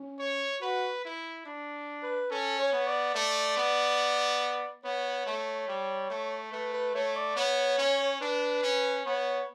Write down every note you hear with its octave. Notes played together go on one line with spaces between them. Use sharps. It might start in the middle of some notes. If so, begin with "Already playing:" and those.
Already playing: C#4
C#5
F#4 B4
E4
D4
B4
C#4 A4
C#5
B3
D5
A3 D5
B3
B3 C#5
A3
G3
A3
A3 B4
B4
A3 C#5
D5
B3 C#5
C#4
D4 B4
C#4
B3 C#5